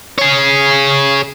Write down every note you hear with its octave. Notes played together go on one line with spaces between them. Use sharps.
G#4 C#5